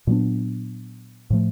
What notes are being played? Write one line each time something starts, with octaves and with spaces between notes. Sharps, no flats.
A#2 F#3 B3 D4
A2 F3 A3